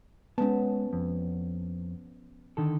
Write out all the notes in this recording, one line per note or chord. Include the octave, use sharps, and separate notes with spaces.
G#3 B3 C#4 A5
F2
D3 D#3 A4